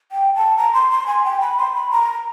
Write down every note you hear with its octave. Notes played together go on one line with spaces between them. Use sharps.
G5
A5
A#5
C6
C6
G#5
G5
B5
C6
B5
A#5